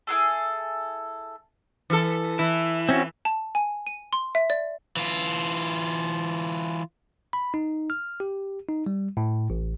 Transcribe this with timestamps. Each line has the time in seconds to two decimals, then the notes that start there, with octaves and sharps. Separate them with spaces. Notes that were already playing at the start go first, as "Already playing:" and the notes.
0.07 E4 F#4 G#4 A4
1.90 E3 A4
2.39 E3 E4
2.89 C4 C#4 F#4
3.25 A5
3.55 G#5
3.87 D#7
4.13 C6
4.35 E5
4.50 D5
4.96 E3 F4
7.33 B5
7.54 D#4
7.90 F6
8.20 G4
8.69 D#4
8.86 G3
9.17 A2
9.50 A1